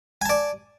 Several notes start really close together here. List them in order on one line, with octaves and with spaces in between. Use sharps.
G#5 A5 D5